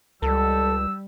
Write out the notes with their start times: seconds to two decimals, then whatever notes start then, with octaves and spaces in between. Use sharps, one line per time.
0.22 C#2 G3 A4 E6